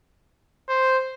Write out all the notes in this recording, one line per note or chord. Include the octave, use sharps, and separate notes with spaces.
C5